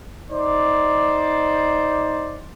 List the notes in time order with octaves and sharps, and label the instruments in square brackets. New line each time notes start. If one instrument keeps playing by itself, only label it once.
[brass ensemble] D#4 C5 D5